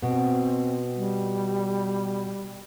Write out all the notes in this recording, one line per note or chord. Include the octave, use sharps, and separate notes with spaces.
B2 B3 C4
G3